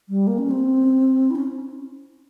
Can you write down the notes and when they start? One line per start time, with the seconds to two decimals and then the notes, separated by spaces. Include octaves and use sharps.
0.09 G3
0.27 A#3
0.38 C#4
0.51 C4
1.31 E4
1.35 C#4